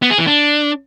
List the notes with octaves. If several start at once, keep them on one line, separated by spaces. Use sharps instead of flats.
B3
G#4
E3
D4